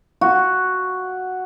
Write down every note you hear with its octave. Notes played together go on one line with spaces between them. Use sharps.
F#4